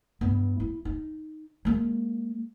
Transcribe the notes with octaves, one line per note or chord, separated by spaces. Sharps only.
G2 B3
E4
D#4
G#3 A#3